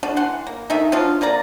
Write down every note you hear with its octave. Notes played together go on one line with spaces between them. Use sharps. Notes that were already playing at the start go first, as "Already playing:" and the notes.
D3 D4 F#4
E3 F#5 C6
A#3
D#3 A3 D#4 E5
F3 F#3 D4 F4
D3 A#3 D5 A#5